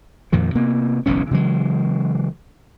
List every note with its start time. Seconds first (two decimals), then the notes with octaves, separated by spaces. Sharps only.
0.32 F2 A#2 D#3 F3
0.55 C3 A#3 B3
1.06 F#1 B1 E3 C#4
1.31 C#3 E3 F#3 G#3